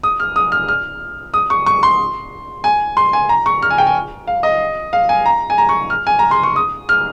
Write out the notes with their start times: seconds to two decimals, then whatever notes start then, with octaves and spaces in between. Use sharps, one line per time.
0.03 D#6
0.20 F6
0.36 D#6
0.52 F6
0.68 F6
1.34 D#6
1.50 C#6
1.66 C#6
1.83 C6
2.64 G#5
2.97 C6
3.13 G#5
3.29 A#5
3.46 C#6
3.62 F6
3.70 G#5
3.78 G5
3.87 G#5
4.27 F5
4.43 D#5
4.93 F5
5.09 G#5
5.26 A#5
5.50 G#5
5.58 A#5
5.69 C#6
5.90 F6
6.07 G#5
6.19 A#5
6.31 C6
6.43 C#6
6.56 D#6
6.89 F6